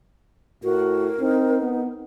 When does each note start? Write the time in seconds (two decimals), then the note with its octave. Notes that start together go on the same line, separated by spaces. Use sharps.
0.63 A2 F#4 A#4
1.20 C4 D#4
1.62 B3